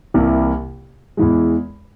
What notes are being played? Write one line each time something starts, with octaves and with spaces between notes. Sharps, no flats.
C2 C3 E3 A#3
E2 E3 G#3